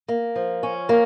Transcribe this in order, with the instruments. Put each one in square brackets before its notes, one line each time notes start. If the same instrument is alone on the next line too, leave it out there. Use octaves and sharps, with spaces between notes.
[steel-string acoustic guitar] A#3
F3
C#4
A#3